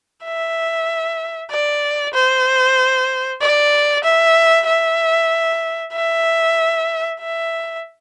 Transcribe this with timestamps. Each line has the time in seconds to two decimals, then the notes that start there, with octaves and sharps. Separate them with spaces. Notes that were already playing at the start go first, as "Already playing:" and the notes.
0.24 E5
1.51 D5
2.14 C5
3.41 D5
4.04 E5
4.67 E5
5.93 E5
7.21 E5